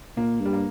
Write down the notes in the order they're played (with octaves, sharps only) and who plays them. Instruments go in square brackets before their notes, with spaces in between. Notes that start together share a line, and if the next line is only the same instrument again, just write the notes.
[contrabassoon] A#2 [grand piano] A#3
[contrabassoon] G2
[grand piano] G3
A#3